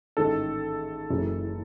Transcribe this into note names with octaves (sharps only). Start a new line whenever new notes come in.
A1 G#2 D#3 A4
F#1 F#2 C#3 E3